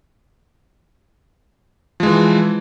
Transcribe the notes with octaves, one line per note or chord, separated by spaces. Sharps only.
E3 F3 G#3